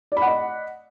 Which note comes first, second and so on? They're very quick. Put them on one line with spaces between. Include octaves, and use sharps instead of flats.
D5 B5 F#5 D#5